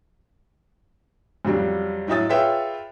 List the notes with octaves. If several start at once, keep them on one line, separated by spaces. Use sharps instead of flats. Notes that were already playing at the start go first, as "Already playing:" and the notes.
F2 C#3 F#3 G3 D4
A2 F#3 D#5 E5 D#6 A6
F4 G#4 B4 C#5 E5 G5